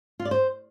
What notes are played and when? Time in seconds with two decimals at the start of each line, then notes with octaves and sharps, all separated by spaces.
0.20 F4
0.25 D5
0.31 C5